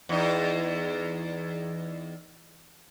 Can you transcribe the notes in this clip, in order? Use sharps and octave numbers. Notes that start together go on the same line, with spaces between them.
E2 D#4